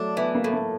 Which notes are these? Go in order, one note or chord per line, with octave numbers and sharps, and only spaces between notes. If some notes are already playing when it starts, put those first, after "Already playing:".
Already playing: F#3 A3 D4
E3 B3
A#3
A2
A#3